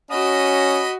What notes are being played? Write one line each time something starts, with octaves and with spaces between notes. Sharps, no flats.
C#4 F#4 D#5 B5 D#6